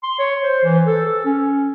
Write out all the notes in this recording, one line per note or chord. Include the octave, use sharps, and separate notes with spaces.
C6
C#5
C5
E3
A4
A4
C#4